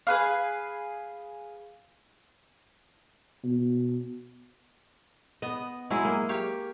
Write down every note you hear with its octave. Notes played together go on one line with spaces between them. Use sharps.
G#4 B4 F5
B2
B3 D#5
F#3 G#3 E4 G#4
A#3
G4 C#5 F5